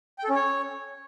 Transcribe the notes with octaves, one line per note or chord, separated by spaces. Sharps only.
G5
A4
C#4
C#5